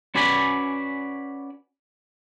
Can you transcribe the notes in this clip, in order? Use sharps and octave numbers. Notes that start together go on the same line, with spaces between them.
C#4 F#4 B4 D5 G#5 B5